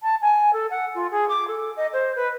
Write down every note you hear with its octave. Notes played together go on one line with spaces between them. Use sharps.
A5
G#5
A4
F#5
F4
G#4
D6
A4
D#5
C5
B4